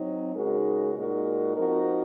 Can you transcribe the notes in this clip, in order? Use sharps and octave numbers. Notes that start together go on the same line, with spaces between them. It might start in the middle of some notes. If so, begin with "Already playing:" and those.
Already playing: F#3 C4 D#4
C#3 G#3 D#4 F#4 A#4
A#2 G#3 D#4 F#4 A#4
F3 C4 D#4 F#4 A#4